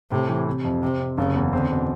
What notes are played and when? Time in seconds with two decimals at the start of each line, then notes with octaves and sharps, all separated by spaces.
0.11 A2 C3
0.29 E3
0.47 C3
0.64 F2
0.82 C3 C4
1.00 C4
1.18 F#1 C#3
1.36 E2
1.53 D3 C4
1.71 B2